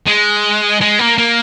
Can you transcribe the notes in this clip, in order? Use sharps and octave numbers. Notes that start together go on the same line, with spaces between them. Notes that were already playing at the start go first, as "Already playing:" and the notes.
G#3
G#3
A#3
A#3